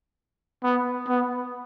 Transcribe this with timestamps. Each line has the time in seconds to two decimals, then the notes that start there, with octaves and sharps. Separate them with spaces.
0.63 B3
1.07 B3